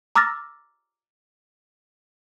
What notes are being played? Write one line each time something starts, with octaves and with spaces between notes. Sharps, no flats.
A#5 D6 E6 F6 A6 A#6